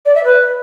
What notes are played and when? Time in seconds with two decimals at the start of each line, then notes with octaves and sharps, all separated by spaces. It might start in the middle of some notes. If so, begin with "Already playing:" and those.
0.05 D5
0.15 E5
0.24 B4